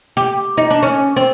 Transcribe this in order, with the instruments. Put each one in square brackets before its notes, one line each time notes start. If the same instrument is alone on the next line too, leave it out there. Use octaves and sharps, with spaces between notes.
[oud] G4
D#4
D4
C#4
C4